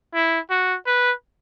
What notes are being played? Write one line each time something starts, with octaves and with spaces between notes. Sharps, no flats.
E4
F#4
B4